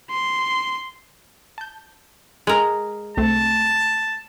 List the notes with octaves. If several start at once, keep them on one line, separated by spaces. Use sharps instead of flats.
C6
A5 G6
G#3 A#4
C2 A3 C4 A5